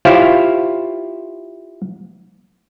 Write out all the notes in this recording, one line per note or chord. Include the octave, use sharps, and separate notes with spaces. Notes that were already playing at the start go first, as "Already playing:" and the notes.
E4 F4 G4 C5 C#5 F5